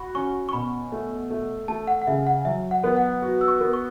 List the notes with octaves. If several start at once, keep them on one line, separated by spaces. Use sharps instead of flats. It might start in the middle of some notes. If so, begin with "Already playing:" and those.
Already playing: F#4 B5 C#6
C#4 C#6
C#6
B2 B5
A3
A3
A3 A5
F#5
F#5
C#3 E5
F#5
F#3 E5
F#5
B3
F#5
F#4
E6
C#6
B3
C#6